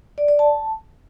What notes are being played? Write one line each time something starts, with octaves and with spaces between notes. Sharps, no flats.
D5
D5
A5